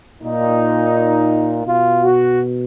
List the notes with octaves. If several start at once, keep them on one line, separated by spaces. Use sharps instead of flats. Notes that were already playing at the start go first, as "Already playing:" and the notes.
A#2 D#4
B2 F4
F#4